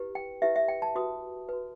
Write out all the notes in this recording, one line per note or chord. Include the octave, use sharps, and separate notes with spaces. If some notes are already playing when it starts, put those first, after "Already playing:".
Already playing: E4 G4 B4
G5
E4 G4 B4 E5
E5
G5
A5
F#4 B4 D#6
F#4 B4